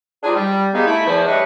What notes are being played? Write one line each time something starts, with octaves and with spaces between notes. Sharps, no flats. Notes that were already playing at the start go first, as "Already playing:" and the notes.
G3 C4 D4 D#4 F4 G#4
G3
G3 G#3 A#3 B3 D#4 G#4
A3 E4
E2 F3
G3 A3 D4 B4 C#5 D#5